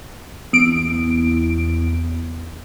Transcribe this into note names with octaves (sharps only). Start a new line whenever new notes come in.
E2 D7